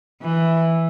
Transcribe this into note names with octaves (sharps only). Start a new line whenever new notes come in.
E3